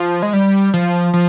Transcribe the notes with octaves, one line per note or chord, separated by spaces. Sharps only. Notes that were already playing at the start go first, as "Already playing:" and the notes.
Already playing: F3
G#3
G3
F3
F3